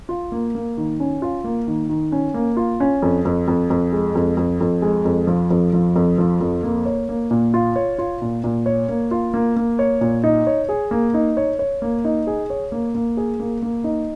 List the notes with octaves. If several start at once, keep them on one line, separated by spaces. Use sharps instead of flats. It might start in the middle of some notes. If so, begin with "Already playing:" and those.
F4
A#3
A#3
D#3
C#4
F4
A#3
D#3
D#3
C#4
A#3
F4
C#4
F2
F2
F2
F2
G#3
F2
F2
F2
G#3
F2
F3
F2
F3
F2
F3
F2
A#3
C#5
A#3
A#2
F4
C#5
F4
A#2
A#2
C#5
A#3
F4
A#3
A#3
C#5
A#2
D#4
C#5
G#4
A#3
D#4
C#5
C#5
A#3
D#4
G#4
C#5
A#3
A#3
G#4
A#3
A#3
D#4